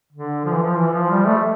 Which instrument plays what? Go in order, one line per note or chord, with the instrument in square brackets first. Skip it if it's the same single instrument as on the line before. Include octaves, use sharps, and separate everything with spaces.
[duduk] D3
F3
E3
F3
E3
F3
G3
A3